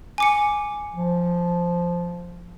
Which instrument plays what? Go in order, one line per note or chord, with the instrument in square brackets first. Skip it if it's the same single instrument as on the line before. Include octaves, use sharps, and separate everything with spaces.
[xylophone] G#5 D6 C#7
[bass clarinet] F3